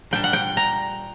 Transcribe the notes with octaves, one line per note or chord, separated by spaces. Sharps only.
A#2 G3 D4 G5
F#5
G5
A#5